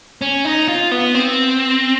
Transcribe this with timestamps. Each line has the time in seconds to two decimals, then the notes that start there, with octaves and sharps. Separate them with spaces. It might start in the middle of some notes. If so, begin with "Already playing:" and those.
0.22 C#4
0.45 D#4
0.68 F4
0.91 B3
1.14 C4